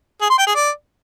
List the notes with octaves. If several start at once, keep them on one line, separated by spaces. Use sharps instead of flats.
G#4
C6
G5
G#4
D5